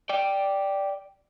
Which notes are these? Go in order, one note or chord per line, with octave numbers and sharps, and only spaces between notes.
D5 G5